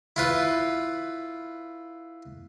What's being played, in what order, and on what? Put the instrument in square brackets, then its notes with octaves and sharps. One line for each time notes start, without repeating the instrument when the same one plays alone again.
[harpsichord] E4 F4 B4